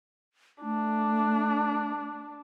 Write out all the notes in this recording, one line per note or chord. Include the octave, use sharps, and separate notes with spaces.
A3 D4